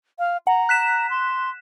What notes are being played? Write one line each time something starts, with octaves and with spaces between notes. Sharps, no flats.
F5
F#5 A#5
F#6 B6 E7
C6